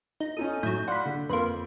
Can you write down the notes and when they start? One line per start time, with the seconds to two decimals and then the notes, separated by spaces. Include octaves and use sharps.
0.20 D#4
0.37 C#4 D#4 A4 D#6
0.63 A2 F#3 G6
0.88 D5 F5 F#5 B5 C6
1.06 D3
1.29 F2 A#3 B4 C6